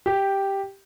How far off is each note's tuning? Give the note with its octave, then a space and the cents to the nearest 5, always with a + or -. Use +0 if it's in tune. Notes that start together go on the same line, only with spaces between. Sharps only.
G4 +0